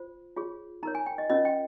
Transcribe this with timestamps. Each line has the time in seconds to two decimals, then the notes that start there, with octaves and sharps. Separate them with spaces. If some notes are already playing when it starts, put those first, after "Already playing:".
Already playing: F4 C5
0.37 F4 G#4 C#5
0.83 D#4 A#4 C#5 A#5
0.95 G#5
1.06 G5
1.18 D#5
1.29 C#4 F4 A#4 C#5 D#5
1.45 G5